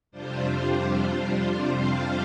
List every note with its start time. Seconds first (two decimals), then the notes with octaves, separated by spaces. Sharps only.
0.11 F2 C3 G3 D4 F4 C5
1.68 F5